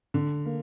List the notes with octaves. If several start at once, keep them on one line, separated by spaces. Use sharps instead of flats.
D3
A#3